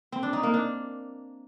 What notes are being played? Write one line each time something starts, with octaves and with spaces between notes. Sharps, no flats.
C4
D4
D#4
A#3
D4